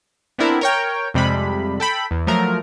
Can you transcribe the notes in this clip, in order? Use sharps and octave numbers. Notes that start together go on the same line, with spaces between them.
B3 C4 D4 E4 A#4
A#4 C#5 G5
F2 C3 G3 G#3 B5
A4 G5 B5
E2
F3 F#3 A3 A#4